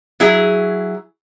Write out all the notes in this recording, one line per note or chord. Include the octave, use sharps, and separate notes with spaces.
F#3 E4 G#4